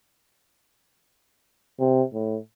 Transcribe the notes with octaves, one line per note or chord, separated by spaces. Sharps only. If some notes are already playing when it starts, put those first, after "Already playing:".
C3
A2